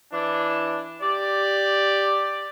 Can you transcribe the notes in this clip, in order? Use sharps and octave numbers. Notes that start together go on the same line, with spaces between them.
E3 D4
G4 D5